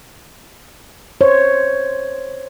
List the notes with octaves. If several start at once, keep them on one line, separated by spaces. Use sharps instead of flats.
C5 C#5